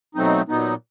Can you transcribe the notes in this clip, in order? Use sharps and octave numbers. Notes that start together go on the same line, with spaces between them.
B2 F#3 A3 C4 D#4
A#2 F#3 B3 D#4